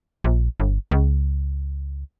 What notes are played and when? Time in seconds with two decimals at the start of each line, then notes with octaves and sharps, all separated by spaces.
0.24 A#1
0.60 G1
0.91 C#2